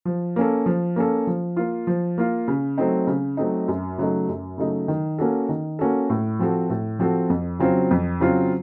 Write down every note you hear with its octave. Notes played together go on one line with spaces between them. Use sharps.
F3
A#3 C#4 A4
F3
A#3 C#4 A4
F3
A#3 F4
F3
A#3 F4
C#3
F#3 A3 C4 D#4
C#3
F#3 A3 C4 D#4
F#2
C#3 F#3 A3 D#4
F#2
C#3 F#3 A3 D#4
D#3
A#3 C#4 F#4 A4
D#3
A#3 C#4 F#4 A4
A2
F3 C4 F#4 A4
A2
F3 C4 F#4 A4
F2
C#3 F#3 C4 F4
F2
C#3 F#3 C4 F4